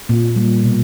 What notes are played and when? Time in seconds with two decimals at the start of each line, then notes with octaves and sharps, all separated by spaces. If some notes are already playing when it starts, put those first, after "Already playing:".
0.09 A#2
0.36 G3 A#3
0.64 B2